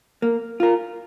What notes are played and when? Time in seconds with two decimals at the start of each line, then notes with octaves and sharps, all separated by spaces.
0.22 A#3
0.60 F4 A#4